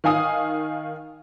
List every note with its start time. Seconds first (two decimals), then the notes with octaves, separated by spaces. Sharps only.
0.04 D#3 F5 G#5 D#6